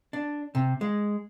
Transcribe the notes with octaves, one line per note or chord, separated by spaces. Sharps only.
D4
C3
G#3